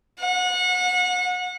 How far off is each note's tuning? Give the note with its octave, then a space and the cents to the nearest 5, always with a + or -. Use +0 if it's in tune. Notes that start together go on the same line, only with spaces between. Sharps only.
F#5 -30